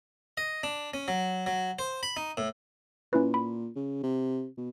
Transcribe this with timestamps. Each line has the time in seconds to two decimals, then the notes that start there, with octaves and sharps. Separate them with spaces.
0.37 D#5
0.63 D4
0.94 C#4
1.08 F#3
1.46 F#3
1.79 C5
2.03 B5
2.17 D#4
2.37 A2
3.13 A#2 C#4 E4 B4
3.34 B5
3.76 C#3
4.03 C3
4.58 B2